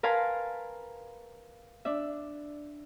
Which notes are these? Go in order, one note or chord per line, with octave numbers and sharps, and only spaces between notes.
A#4 B4 F5 G#5 A5 C6
D4 E5